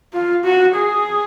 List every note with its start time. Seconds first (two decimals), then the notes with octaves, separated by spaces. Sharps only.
0.13 F4
0.44 F#4
0.75 G#4